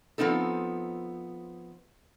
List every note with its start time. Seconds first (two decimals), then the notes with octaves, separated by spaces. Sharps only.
0.18 F3 B3 C4 D#4 A4